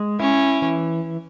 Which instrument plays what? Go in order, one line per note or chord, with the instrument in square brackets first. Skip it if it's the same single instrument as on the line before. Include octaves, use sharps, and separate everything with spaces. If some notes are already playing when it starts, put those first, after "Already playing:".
Already playing: [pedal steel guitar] G#3
[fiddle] C#4 [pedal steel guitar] E4
[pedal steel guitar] E3